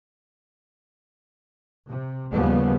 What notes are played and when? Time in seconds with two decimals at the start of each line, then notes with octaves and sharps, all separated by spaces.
1.87 C3
2.33 D#2 C#3 F3 G3 B3